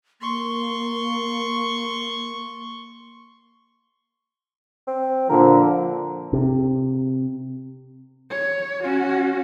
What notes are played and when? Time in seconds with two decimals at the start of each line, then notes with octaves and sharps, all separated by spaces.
0.21 A#3 C6 C#6
4.87 C4
5.29 A#2 D3 F3 A#4
6.33 C3
8.30 C#5
8.84 C#4 F#4